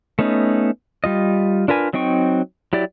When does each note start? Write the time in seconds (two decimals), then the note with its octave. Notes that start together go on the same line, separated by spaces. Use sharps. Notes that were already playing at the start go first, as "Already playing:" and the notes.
0.19 A3 B3 C#4 D#4
1.04 G3 F4 D#5
1.68 D4 F4 A#4 B4 G#5
1.93 F#3 C4 D#4 G5 C#6
2.73 F#3 E4 G4 D5